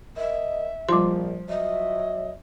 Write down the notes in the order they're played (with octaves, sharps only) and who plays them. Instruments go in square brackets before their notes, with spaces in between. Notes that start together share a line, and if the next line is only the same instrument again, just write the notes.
[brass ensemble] A#4 D#5 [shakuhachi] E5
[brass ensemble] A#1 [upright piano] F3 [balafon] G3 C6
[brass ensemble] F#3 C#5 E5 [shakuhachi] D#5